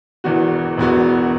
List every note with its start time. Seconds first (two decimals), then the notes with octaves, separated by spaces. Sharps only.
0.24 E1 E2 E3 B3 F#4
0.77 E1 E2 E3 B3 F#4